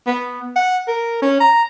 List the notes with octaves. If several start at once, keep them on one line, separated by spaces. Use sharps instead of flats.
B3
F#5
A#4
C#4
A#5